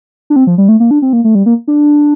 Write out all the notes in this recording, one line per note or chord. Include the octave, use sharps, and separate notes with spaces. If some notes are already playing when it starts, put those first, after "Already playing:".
D4
C4
F3
G3
A3
A#3
D4
C4
A#3
A3
G3
A#3
D4